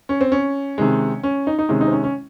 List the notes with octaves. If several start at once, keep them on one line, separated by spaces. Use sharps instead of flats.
C#4
C4
C#4
C3 D#3 G#3
C#4
D#4
D#4
C3 D#3 G#3 C#4
D#4
C4
C#4
C#4